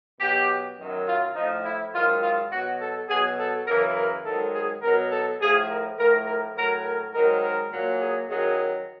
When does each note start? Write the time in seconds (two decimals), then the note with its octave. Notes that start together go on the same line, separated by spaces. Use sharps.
0.20 B2 F#3 G4
0.78 F#2 D#3 F#3
1.06 F4
1.35 A2 F3 D#4
1.64 E4
1.93 G#2 D#3 F#3 F4
2.22 F4
2.51 B2 F#3 F#4
2.80 A4
3.09 B2 F#3 G#4
3.38 A4
3.66 F#2 C#3 E3 A#4
3.96 A#4
4.24 G#2 D#3 F#3 A4
4.53 G#4
4.82 B2 F#3 A#4
5.11 A4
5.41 A2 F3 G#4
5.69 A#4
5.97 A2 F3 A#4
6.26 A#4
6.56 A2 F#3 A#4
6.84 A#4
7.13 G#2 D#3 F#3 A#4
7.42 A#4
7.71 A#2 F#3
8.00 G#4
8.29 F#2 D#3 F#3 G#4